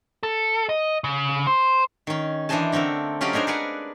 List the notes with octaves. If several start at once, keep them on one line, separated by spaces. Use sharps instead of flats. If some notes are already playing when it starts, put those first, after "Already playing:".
A4
D#5
C#3
C5
D#3 C#4
E3 D4 C5 D#5 G#5 A5
D3 A3 C4 A4 A#4
F#3 C#4 F4 G4 D5 D#5
D4 D#4 G#4 A#4 C5
G#4 A#4 B4 D5 F#5 G#5